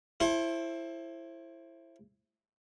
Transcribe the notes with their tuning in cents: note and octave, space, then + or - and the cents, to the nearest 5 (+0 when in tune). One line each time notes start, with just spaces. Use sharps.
E4 +15 A4 +0 C5 +30